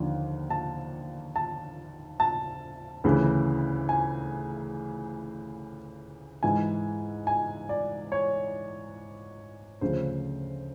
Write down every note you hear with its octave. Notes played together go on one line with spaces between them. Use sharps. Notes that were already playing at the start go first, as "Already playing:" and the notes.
Already playing: D#2 D3 F3
A5
A5
A5
D2 C#3 E3
G#5
G#2 E3 G#5
G#5
D5
C#5
D2 C#3 F3 C5